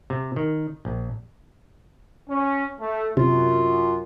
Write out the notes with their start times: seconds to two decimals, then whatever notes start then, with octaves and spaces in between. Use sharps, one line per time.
0.10 C3
0.36 D#3
0.85 A#1
2.29 C#4
2.80 A3
3.17 F#2 C3 F4